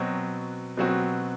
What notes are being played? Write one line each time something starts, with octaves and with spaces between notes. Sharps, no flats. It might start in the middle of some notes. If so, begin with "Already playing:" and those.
Already playing: B2 F#3 C4 F#4
B2 F#3 C4 F#4